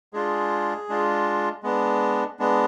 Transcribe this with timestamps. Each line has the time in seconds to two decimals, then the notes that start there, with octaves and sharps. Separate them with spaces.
0.13 G#3 D4 F4 G#4
0.89 G#3 D4 F4
1.63 G#3 B3 D4
2.39 G#3 B3 D4